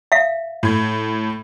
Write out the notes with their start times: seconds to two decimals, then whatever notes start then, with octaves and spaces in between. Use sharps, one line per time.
0.12 E5 F5
0.63 A2 G#6